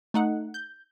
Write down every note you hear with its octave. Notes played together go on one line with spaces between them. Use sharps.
A3 D#4 F#5
G6